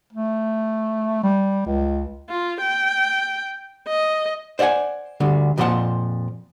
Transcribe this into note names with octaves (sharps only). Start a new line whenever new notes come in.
A3
G3
C#2
F4
G5
D#5
C5 D5 E5 F#5 G#5
D2 D3 G3
F2 A#2 F3 C5 F#5 A5